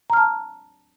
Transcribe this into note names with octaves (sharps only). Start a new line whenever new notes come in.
A5 A#5 F6